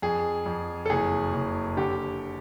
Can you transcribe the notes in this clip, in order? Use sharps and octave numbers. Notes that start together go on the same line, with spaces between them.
F2 G#4
F2
A4
F#1 G#4
F#1
D3 G4